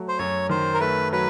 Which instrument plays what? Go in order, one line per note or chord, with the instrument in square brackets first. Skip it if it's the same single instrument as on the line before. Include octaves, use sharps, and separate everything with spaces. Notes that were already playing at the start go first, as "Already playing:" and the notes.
Already playing: [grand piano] F#3 A3
[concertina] C5
[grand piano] F#2 [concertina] C#5
[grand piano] D#3 [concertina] C5
[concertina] A#4
[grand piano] A3 [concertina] B4
[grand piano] F#3 [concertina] B4